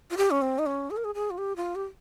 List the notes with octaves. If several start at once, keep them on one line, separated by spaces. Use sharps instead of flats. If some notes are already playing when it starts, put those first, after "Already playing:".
F4
G4
C#4
C4
D#4
C#4
G#4
A#4
G#4
G#4
F4
G4
F4
G4